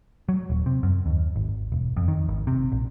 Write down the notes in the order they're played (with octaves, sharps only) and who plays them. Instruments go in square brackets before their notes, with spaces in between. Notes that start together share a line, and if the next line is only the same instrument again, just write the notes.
[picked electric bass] F#3
D#1
C3
F#2
D#2
G#1
E1
F2
D#3
G#1
C3
A#1